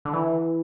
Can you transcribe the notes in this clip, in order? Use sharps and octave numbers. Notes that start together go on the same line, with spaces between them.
D3
E3